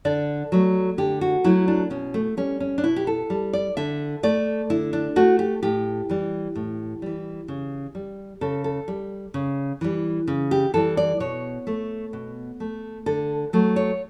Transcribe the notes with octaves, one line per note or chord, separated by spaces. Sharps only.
D3 D5
F#3 A3
D3 G4
F#4
F#3 A3 E4
D4
B2 C#4
A3
G3 C#4
C#4
D4
B2 E4
G4
A4
G3
D5
D3 E5
A3 D5
D3 E4
D4
A3 F#4
G4
A2 G4
E3 G3
A2
E3 G3
C#3
G3
C#3 A4
A4
G3
C#3
E3 G3
C#3
G4
E3 G3 A4
D5
B2 C#5
A3
B2
A3
D3 A4
F#3 A3
C#5